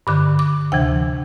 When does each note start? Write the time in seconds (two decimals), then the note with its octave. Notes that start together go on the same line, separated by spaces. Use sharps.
0.07 G2 D3 D6
0.39 D6
0.72 D2 C3 E3 G5